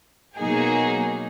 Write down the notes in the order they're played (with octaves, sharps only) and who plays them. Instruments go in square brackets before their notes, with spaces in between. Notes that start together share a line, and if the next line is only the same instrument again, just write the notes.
[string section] B2 F#3 A#3 D#4 G#4